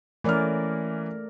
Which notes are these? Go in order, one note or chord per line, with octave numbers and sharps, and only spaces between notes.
E3 A3 C#4 A#4 D5 F6